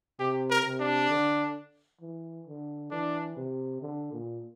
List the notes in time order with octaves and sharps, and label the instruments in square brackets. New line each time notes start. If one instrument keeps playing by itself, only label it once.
[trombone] C3 [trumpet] G4
[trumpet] A#4
[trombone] C3
[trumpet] D4
[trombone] D3
E3
D3
[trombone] E3 [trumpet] D4
[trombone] C3
D3
A#2